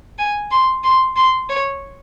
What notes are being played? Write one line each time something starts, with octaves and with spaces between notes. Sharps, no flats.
G#5
C6
C6
C6
C#5